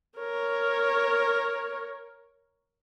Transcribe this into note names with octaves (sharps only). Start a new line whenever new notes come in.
A#4 C#5